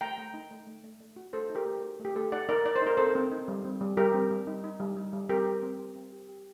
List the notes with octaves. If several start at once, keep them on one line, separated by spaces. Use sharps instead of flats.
A3 G5 A#5
A3
D#4
A3
A3
A3
A3
F#4
A3 A4 C5
D#4
G4 A#4
A3
F#4
A3
G4
A3 A4
D#4 D5 F#5
D#4 A#4 D5
D#4 D5
C5
D#4 A#4
C4 A4 C5
C4
D#4
G3
C4
G3
G3 G4 A#4
C4
G3
D#4
D#4
G3
D#4
G3
C4 G4 A#4
G4
C4
G4
C4
G4
G4